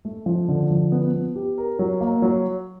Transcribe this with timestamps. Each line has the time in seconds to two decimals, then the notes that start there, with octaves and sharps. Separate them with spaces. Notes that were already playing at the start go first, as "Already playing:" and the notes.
0.05 A3
0.26 F3
0.48 D3
0.71 F3
0.92 B3
1.13 B3
1.35 G4
1.58 A#4
1.79 F#3
2.01 A#3
2.22 F#3